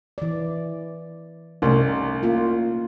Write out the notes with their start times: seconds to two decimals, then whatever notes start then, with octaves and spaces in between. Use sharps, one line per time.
0.18 E3 D5
1.62 C2 A3 C#4 D#4
2.23 A#3 F4